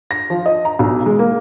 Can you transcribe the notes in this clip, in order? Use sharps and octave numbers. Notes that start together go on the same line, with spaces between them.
A#6
F3
D#5
A#5
B1
G#3
A#3